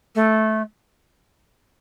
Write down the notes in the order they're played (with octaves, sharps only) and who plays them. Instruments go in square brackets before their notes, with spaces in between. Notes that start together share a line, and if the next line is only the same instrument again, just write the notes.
[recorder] A3